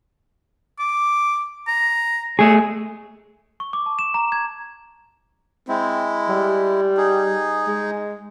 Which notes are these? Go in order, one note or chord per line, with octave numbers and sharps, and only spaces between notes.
D6
A#5
A3 G#4 C#5
C#6
D6
A5
E7
A#5
G#6
G#3 C4 E4
G3
D#4 G#4
G#3